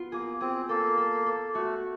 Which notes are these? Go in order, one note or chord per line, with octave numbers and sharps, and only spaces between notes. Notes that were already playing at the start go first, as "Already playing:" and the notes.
Already playing: B3 F4
A#3 G#4
C4 G#4
A#3 A4
A4
A4
A3 F#4